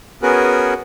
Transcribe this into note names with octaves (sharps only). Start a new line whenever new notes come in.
B3 C#4 F#4 G#4 A#4 B4